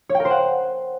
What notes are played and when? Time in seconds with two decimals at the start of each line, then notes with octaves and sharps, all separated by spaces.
0.09 C#5
0.15 G5
0.20 A#4
0.25 C5
0.30 F#5